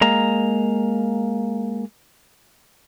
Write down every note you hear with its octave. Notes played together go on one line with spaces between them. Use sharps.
G#3 A#3 A#5